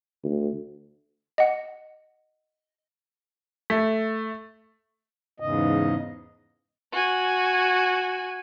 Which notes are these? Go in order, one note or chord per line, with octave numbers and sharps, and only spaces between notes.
D2
D#5 F#5
A3
E2 G#2 C#3 D#5
F#4 G#5